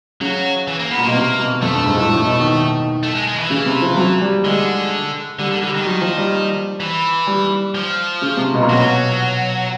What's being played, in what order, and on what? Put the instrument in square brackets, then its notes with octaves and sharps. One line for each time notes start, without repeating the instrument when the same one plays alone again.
[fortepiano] C#3 [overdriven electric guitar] F#3
[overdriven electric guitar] E3
A#3
B3
[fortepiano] A#2
[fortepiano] B2 [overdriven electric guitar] A#3
[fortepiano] C3
B2
[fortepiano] F2 [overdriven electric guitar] A3
[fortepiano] G2
G#2
A2
A2
B2
D#3
[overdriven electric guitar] A3
G#3
G#3
D#3
E3
[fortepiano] C#3
C3
F3
F#3
G3
[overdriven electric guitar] D3 [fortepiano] G#3
[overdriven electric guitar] D3 [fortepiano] G3
[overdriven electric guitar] D3
[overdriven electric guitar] D3 [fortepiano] G3
[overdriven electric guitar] D#3
[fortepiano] F#3
F3
G3
[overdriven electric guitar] E3
[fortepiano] G3
[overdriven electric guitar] F3
[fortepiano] C#3
C3
B2
A#2
[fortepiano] B2 [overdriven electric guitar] F#3